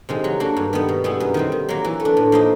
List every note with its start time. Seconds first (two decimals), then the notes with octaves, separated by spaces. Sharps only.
0.09 C3 D#3 G#3
0.24 F#3
0.40 A#3 D4 F#4
0.57 G2
0.73 D#3 G3 B3
0.89 B2
1.04 G3 B3 E4 G#4
1.20 F#2
1.34 D#3 G3 C4
1.52 D#3
1.69 F#3 A#3
1.84 E3
2.00 A3
2.05 D4
2.17 A2
2.32 F3 A#3 D#4